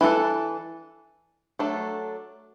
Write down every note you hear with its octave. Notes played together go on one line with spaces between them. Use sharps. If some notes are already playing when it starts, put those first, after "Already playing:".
E3 D4 F#4 A4
F#3 A3 D4 A4